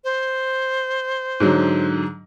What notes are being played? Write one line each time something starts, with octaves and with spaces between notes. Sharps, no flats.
C5
G#2 D3 F#3